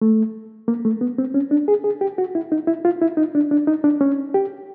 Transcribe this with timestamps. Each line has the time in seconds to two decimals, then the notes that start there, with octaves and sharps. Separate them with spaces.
0.02 A3
0.68 A#3
0.85 A3
1.01 B3
1.18 C4
1.34 C#4
1.51 D4
1.68 G#4
1.84 G#4
2.01 G4
2.18 F#4
2.35 E4
2.52 D#4
2.67 E4
2.85 F4
3.02 E4
3.17 D#4
3.35 D4
3.51 D4
3.67 D#4
3.84 D4
4.01 C#4
4.34 G4